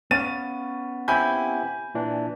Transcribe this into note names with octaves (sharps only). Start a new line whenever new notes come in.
B3 C#4 F5 A6 D#7
C4 E4 G4 G#5 B5 G6
A#2 E3 D4